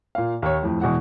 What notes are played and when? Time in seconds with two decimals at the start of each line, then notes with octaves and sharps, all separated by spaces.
0.15 A#2 F5
0.42 D#2 C#5
0.63 F2 A2
0.82 E2 B2 G#3 F#5